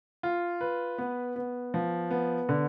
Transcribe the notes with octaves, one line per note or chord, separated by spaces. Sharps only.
F4
B4
B3
B3
F3
B3
D3